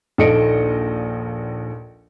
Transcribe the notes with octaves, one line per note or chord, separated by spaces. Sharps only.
A#1 D#2 A4 D#5 C#7 D7